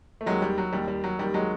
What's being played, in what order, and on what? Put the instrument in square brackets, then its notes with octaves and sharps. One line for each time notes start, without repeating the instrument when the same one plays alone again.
[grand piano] A3
D#2 D#3 F#3 G#3
G3
F#3
D#2 D#3 G3
G3
F#3
D#2 D#3 G3
F#3 G#3